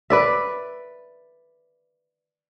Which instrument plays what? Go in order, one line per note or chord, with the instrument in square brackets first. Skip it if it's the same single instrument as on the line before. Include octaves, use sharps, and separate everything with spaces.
[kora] B4 D5 E5